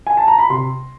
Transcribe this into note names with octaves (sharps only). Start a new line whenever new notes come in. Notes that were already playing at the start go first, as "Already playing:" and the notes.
G#5
A5
A#5
B5
C3 C6